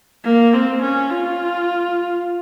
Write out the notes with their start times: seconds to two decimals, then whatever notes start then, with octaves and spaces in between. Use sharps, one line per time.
0.25 A#3
0.53 C4
0.82 C#4
1.11 F4